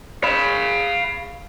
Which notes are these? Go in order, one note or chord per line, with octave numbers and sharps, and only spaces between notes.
F5 B5